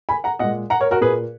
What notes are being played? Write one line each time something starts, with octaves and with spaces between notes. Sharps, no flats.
G#5 B5
F#5 A#5
A#2 G#3 D#5 F#5
F#5 A#5
A#4 C#5
F#4 A#4
A#2 A#3 G#4 B4